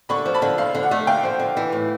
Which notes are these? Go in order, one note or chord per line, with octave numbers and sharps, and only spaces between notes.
D3 B5 C#6
F3
A5 B5
D3
F3 F5
D3
F#5
A3
D3 F5 G5
F3
D3
E3
A2